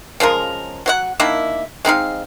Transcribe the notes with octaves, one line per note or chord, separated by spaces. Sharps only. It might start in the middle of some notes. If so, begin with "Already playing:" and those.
C#3 F3 G#3 A#4
F#3 C5 F#5
D#3 A#3 D4 E4
G#3 C4 D#4 F5